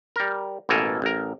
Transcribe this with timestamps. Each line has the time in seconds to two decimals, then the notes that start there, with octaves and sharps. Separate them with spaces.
0.16 G3 A#4
0.69 A1 B2 A#3 A4 A#4 G#5
1.02 A1 A#4